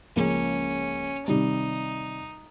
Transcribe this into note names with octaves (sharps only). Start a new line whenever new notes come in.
C#2 C#3 F3 A#3 C#4
C3 D#3 G3 D#4